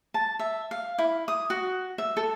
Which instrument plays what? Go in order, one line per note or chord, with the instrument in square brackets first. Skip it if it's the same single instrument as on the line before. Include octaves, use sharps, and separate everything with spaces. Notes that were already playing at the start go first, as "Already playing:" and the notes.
[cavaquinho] A5
E5
F5
E4
D#6
F#4
E5
A4